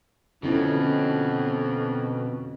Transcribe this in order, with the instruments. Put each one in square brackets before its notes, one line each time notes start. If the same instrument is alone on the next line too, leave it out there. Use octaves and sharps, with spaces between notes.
[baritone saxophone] F2 [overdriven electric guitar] B2 [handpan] D3 C#4 E4